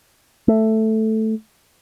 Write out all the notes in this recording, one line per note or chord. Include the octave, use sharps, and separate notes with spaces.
A3